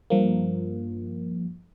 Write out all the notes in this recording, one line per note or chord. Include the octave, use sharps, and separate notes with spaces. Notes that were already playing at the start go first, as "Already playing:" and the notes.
G2 F3 A#3